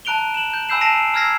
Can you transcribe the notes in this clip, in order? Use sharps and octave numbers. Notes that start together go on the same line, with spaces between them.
A5 A#5 F#6 D7 F7 G7
E7 F#7
G6
G#5 B5 E6 G6 C7 E7
A5 A#6 C7 D7 E7 F7
A#5 E6 F6 G#6 A#6 C7